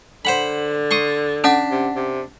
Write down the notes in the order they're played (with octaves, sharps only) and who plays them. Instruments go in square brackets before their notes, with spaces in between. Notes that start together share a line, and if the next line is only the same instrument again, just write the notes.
[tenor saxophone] D3 [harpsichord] C5 F#5 B5
[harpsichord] C6 C#6 D#6
[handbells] C#4 F#5 B6 [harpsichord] D4
[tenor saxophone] C3
C3